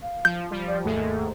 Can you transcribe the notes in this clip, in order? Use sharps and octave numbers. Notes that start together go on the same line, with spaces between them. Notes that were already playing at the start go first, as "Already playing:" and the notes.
F5
F3 G6
F3 G3
D5
D#2 G#2 A3